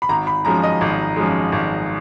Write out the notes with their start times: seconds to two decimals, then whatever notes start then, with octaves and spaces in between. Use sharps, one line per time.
0.02 B5
0.09 G#1 A#5
0.27 B5
0.45 F#2 F3 G#3 A#5
0.63 D#5
0.81 G#1
1.17 F#2 F3 G#3
1.52 G#1